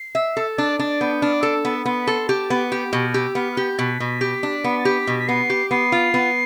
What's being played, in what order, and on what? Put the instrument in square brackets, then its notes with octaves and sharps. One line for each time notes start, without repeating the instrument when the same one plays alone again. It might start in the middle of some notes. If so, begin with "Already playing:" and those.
Already playing: [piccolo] C7
[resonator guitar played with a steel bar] E5
A4
[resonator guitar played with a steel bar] D4 [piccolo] A6
[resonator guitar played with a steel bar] D4 [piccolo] A6
[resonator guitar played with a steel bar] B3 [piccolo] G6
[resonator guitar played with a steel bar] D4 [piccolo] F6
[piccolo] D6
[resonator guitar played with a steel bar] A4 [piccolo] E6
[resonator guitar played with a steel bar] B3
[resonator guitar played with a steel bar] B3 [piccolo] C6
[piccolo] B5
[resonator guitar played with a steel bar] A4 [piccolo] C6
[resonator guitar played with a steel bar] G4 [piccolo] A5
[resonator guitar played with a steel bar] B3
[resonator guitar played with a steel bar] G4 [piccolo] G6
[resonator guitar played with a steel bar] B2 [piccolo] F6
[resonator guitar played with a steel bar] G4 [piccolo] E6
[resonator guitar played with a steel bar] B3 [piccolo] F6
[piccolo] F6
[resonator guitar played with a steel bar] G4 [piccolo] G6
[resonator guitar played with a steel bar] B2 [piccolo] B6
[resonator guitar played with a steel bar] B2
G4
D4
B3
[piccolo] A6
[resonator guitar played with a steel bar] G4 [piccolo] B6
[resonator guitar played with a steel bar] B2
[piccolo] B6
[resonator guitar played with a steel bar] B3 [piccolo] C7
[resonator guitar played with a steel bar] G4
[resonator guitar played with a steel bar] B3 [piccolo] C7
[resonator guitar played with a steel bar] F4
B3